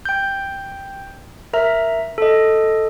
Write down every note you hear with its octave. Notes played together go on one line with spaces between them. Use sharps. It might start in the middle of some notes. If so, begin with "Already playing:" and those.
G5 G6
A#4 E5 A#5
A4 D#5